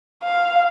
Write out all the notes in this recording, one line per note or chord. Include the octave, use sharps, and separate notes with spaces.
F5